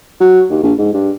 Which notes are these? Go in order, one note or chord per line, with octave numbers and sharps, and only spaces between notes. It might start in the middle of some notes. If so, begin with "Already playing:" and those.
F#3
D#2
A#1
G#2
G2